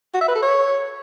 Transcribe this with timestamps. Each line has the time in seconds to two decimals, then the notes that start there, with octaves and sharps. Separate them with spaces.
0.14 F#4
0.21 E5
0.28 B4
0.35 A4
0.42 C#5